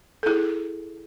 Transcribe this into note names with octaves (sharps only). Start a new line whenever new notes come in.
A4
E4 G#4